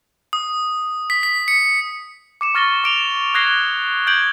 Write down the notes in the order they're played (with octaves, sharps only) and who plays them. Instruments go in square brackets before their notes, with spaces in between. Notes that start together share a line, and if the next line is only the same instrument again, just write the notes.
[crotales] D#6
B6
B6
C#7
D6 C#7 E7
C#6 F6 A6 A#6 C#7 G7
D6 D7 F7 G7
D#6 F#6 G#6 A#6 C7 G7
G6 G#6 D7 F#7